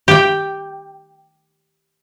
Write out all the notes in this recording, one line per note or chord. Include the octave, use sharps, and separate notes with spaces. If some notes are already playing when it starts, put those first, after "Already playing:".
G4 G5